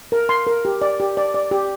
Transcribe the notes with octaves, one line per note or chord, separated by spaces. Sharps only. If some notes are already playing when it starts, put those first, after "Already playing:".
A#4
C6
A#4
G4
D5
G4
D5
D5
G4